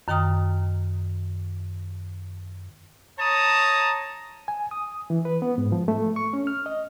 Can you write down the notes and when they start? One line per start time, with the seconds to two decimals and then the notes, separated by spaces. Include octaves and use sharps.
0.08 F#2 D#3 G5 A#5 D#6 F6
3.19 C#5 A5 A#5 D#6
4.48 G#5
4.71 D#6
5.10 E3
5.25 B4
5.42 B3
5.58 G#2
5.72 F3
5.88 A3
6.16 C#6
6.33 C#4
6.47 F6
6.66 D#5